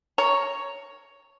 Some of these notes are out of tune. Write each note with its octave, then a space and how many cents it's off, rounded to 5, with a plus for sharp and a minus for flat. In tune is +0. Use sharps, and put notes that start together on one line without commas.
C#5 +5 A#5 +0